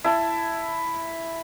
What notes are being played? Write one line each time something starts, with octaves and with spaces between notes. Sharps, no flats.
E4 A5